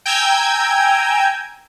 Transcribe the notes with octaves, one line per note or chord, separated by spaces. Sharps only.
G5 G#5 A#5 E6 G6 G#6